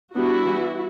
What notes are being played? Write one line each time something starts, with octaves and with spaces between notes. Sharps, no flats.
G3 B3 D4 E4 F#4
E3 G3 B3